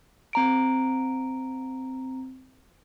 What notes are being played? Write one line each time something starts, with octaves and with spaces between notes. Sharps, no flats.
C4 A#5 D7